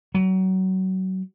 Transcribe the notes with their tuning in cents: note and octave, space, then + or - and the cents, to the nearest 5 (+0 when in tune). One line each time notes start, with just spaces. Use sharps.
F#3 +25